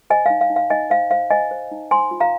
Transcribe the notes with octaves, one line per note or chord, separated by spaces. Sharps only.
C5 D#5 G#5
F5
D#4
F5
D#4
F5
D#4 D#5 G#5
C5 F5
C5 F5
C5 D#5 G#5
C5
D#4
C5 G#5 C6
F4
F5 A#5